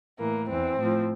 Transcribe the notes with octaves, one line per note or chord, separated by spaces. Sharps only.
A2 E3 A#3
E2 E3 C4
A2 F3